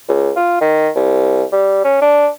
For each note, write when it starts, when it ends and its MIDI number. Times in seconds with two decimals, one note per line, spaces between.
0.09 0.31 37
0.36 0.58 65
0.61 0.89 51
0.96 1.44 36
1.53 1.80 55
1.84 1.97 61
2.02 2.29 62